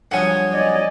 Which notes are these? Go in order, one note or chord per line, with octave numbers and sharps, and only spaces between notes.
G2 F3 F#3 C#5 F#5 G#5 D#6
D5 D#5